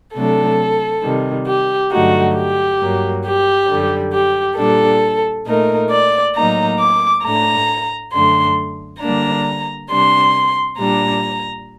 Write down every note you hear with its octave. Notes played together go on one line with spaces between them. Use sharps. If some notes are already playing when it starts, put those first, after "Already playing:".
C3 F#3 A3 D4 A4
C3 D#3 G3
G4
G2 D3 F#3 A3 D#4 F#4
G4
G2 F#3 A#3
G4
F#2 D3 G3
G4
A#2 G3 D4 A4
A#2 A3 D#4 A#4
D5
A2 F#3 A#3 D#4 A#5
D6
A2 A3 D4 A#5
F#2 D3 A3 D4 C6
D3 G3 A#3 D4 A#5
C3 G3 D4 C6
A#2 G3 D4 A#5